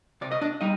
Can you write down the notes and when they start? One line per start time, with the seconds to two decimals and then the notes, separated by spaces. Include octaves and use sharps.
0.21 C3 D5
0.32 D#5
0.41 D4 D5
0.61 G3 D#4 D#5